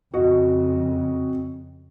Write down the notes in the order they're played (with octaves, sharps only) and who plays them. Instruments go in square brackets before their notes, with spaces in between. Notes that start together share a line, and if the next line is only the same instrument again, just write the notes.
[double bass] F2 C#3 [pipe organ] C4 [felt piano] F#4 D#5